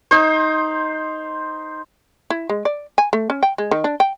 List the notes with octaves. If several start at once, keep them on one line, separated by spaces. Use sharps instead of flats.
D#4 C5
E4
G#3
D5
G#5
A3
C#4
G5
G#3
D#3
D4
G5